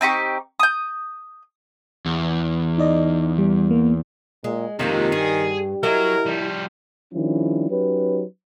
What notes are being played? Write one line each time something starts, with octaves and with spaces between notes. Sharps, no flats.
C4 D#4 G4 C#6
D#6 G6
E2
D#4 D5 D#5
G3
A#3
A#2 G#3
F2 C3 D#3 G#3 A#3 F4 G4
G2 G#4
F#3 E4 F#4 A#4 D#5
F3 G3
D#3 F3 G3 C#4 D4 E4
F#3 C#4 D#4 G4 B4